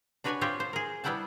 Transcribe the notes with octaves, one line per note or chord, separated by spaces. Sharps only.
D4 F#4 B4 C#5 D5 G#5
C4 F4 G4 C#5 F#5 G5
C5
G#4 A#4
G3 B3 E4 F#5 G5 A5